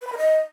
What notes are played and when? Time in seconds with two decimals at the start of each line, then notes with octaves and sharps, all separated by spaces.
0.01 B4
0.07 B5
0.12 A#4
0.17 D#5